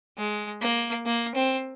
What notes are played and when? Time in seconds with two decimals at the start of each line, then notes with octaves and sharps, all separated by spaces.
0.18 G#3
0.61 A#3
1.06 A#3
1.35 C4